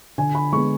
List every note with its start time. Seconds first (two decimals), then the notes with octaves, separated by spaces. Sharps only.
0.18 D3 G#5
0.35 B5
0.52 G#3 B3 C#6